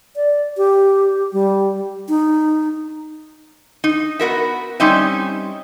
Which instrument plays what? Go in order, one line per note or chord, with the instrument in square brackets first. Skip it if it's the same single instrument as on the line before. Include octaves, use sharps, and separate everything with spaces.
[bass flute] D5
G4
G3
D#4
[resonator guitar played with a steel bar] D#4
B3 F#4 A#4 E5
G3 C4 C#4 D#4 D#5 E5